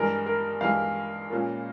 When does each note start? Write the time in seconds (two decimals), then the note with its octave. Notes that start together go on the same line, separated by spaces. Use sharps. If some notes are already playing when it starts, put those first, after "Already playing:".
Already playing: G2 E3 G#3 A#4
0.26 A#4
0.61 G2 E3 G#3 F5
1.29 A#2 G#3 C#4 F4 A#4